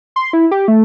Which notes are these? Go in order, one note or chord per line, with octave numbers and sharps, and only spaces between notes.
C6
E4
G4
A3